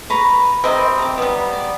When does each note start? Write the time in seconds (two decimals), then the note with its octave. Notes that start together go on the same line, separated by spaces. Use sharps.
0.10 B4 A#5 C#6
0.64 C3 C4 A#4 B4 D#5
0.98 A#5 D6
1.18 G3 B3
1.53 D5